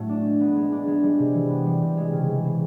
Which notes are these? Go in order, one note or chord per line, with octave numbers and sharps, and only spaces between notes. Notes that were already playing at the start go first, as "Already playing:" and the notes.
Already playing: A2 F#3 A3
D4
G#3
B3
G#3
D4
G#3
G3
C3
E3
B3
G3
C3
G#3
C#3
E3
C4